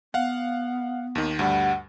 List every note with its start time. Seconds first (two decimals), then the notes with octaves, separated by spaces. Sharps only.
0.14 B3 F5 F#5
1.15 D#2 D#3
1.39 D2 G2 G3 F#5